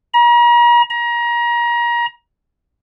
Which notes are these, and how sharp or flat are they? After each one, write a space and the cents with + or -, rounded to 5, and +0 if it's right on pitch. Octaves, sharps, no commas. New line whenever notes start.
A#5 +40
A#5 +30